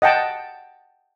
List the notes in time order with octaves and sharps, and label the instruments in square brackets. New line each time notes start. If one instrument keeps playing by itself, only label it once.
[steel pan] D#5 F#5 G5 A5